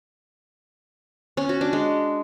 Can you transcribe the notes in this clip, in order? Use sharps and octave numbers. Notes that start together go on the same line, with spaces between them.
C#4
F#4
D4
G#3